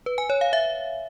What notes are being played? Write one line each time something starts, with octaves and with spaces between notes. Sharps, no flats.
B4
G#5
C#5
F5
E5